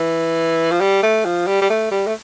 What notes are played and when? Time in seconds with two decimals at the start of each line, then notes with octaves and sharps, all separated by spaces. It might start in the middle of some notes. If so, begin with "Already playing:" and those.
Already playing: E3
0.71 F3
0.81 G3
1.03 A3
1.25 F3
1.47 G3
1.61 G3
1.70 A3
1.91 G3
2.07 A3